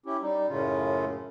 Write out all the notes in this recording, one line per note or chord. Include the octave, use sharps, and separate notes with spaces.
C#4 E4 G4
G3 D#4
F#2 A2 C#3 C#4 F4